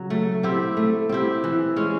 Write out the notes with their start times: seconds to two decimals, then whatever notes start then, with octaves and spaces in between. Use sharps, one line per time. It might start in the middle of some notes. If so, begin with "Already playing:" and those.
Already playing: C#3 F#3
0.10 A3
0.43 C4 E4 G4
0.77 A3
1.09 C4 E4 G4
1.44 E3
1.76 G#3 C#4